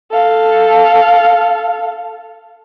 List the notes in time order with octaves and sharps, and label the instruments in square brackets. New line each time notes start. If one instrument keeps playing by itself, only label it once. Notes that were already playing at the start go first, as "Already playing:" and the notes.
[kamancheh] A4 F5